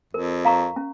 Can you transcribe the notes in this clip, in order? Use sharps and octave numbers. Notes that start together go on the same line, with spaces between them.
F2 A#4
F5 A#5 C#6
C#4